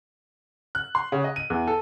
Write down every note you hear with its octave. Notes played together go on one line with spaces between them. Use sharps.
F#6
C6
C#3
D#5
D#7
E2
A4